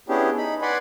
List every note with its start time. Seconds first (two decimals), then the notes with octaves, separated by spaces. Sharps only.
0.09 B3 C#4 D4 E4 G4 G#4
0.38 D#4 B5
0.62 B4 D5 F#5 G#5 B5 C6